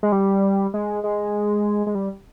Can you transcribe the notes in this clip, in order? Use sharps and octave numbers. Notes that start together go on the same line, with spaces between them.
G#3
G3
G#3
G#3
G#3
G3